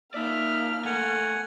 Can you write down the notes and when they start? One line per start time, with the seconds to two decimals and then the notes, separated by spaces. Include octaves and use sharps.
0.14 A#3 D#4 D5 E5 F6
0.85 A3 A#4 F#5 G#5